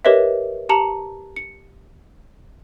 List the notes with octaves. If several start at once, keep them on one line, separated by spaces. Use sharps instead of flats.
G4 A#4 B4 C#5 D#5 E5
G4 A5 A#5 C#7 F#7
C#7